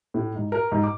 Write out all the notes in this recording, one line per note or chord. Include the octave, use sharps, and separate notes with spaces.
A2
G#2
A#4
G#2
D6